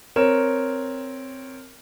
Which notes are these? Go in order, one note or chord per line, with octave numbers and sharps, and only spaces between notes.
C4 A#4 C#5 E7